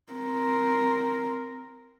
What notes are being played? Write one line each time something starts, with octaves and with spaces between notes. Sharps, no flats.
C4 A#4